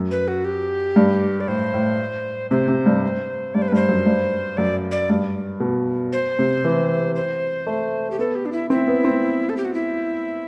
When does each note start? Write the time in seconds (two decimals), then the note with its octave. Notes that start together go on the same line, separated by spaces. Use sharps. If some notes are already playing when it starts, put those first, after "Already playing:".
Already playing: F#2
0.11 B4
0.28 F#4
0.45 G4
0.96 G2
1.40 D5
1.48 A2 C5
1.74 A2
2.51 C3 C5
2.68 C3
2.86 G2
3.54 G2 D5
3.62 C5
3.68 B4
3.72 G2 C5
3.89 F#2
4.06 G2
4.57 F#2 D5
4.91 D5
5.10 G2
5.60 B2
6.13 C5
6.39 C3
6.64 E3
7.15 C5
7.67 A3
8.11 G4
8.19 B3 A4
8.35 G4
8.46 D4
8.52 E4
8.70 C4 E4
8.88 B3
9.05 C4
9.49 A4
9.57 G4
9.65 F#4
9.74 E4